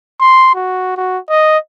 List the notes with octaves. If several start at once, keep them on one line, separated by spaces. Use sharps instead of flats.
C6
F#4
F#4
D#5